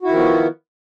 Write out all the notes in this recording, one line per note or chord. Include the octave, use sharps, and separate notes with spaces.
D#3 F3 B3 E4 F#4